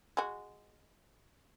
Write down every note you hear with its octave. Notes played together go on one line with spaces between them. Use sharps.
G#3 F#4